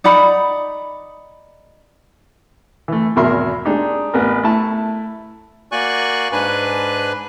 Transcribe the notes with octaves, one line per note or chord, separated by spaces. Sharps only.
D#4 D5 F#5 B5
E3 A3
G#1 E2 B2 A#4 E5 C6
G#3 D4 D#4 G4
A1 B3 A#4
A3 E4 A5
A#3 F#4 D5 G#5 C#6 F#6
G#2 D4 B4 G#5 F#6